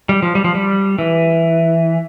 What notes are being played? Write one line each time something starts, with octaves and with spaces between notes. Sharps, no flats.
G3
F3
G3
F3
G3
E3